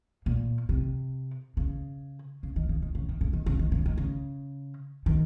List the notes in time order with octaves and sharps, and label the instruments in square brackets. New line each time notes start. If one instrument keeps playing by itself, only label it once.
[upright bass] A#2
C3
C#3
C#3
D#3
C#3
D#3
C#3
D#3
C#3
D#3
C#3
D#3
C#3
D#3
C#3
D#3